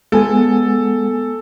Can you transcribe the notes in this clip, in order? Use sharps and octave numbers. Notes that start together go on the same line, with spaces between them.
G#3 B3 A4 G#5